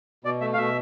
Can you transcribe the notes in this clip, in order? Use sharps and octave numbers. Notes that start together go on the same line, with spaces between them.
B2 D5
A3 E5
F5
B2 E5